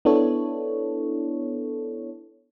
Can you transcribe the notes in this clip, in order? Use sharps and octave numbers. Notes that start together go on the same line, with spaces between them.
B3 D4 E4 A4 C#5